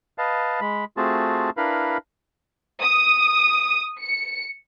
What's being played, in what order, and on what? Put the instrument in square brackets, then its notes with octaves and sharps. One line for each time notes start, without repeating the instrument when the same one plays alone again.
[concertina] B4 D#5 F5 A5
G#3 B5
A3 C4 F4 F#4 G#4 A5
D4 E4 A#4 B4 F5 B5
[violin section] D#6
C#7